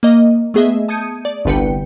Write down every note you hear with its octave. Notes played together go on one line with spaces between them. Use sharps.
A#3 D#5
A3 B3 G#4 D#5 E5
A5 D#6 G6 G#6 C#7 D#7
D5
G1 C2 D3 B4 G5 C#7